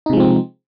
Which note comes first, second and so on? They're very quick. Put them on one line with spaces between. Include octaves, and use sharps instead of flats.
D#4 C3 G#3 F3 C4